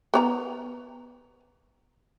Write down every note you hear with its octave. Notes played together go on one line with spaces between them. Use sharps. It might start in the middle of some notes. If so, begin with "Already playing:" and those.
B3 C#5 A#5